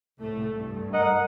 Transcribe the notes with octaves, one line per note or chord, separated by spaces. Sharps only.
C2 A2 A3
G2
A#4 D#5 F#5